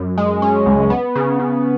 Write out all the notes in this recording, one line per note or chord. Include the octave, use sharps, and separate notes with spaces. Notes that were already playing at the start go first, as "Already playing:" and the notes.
Already playing: F#2
G#3
C#4
C#2
B3
C#3
C#3